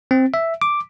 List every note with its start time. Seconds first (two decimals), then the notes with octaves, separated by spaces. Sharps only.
0.11 C4
0.34 E5
0.62 D6